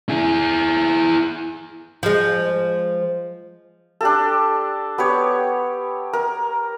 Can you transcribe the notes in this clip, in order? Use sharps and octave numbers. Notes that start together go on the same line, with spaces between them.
E4 G#4
F3 G#3
D4 G4 A4
B3 G4 C#5
A#4